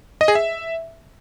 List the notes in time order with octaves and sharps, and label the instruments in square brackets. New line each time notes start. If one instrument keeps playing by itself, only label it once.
[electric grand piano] D#5
G#4
E5